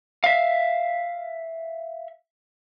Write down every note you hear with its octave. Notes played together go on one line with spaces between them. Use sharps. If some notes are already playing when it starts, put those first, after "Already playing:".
E5 F5